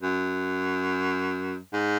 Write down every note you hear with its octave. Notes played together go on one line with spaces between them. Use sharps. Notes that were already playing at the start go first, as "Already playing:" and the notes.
F#2
G#2